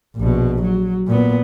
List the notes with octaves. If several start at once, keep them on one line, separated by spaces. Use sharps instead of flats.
A#1 B2
F#3
A#2 B3